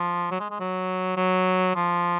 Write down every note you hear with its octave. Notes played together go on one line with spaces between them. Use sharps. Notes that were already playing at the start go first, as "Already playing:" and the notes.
Already playing: F3
F#3
G#3
G#3
F#3
F#3
F3